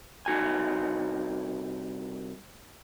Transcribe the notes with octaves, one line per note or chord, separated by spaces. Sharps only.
C2 D#4 F#4 G#5